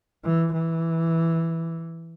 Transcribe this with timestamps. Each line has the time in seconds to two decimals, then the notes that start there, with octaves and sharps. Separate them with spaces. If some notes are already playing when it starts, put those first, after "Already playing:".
0.24 E3
0.53 E3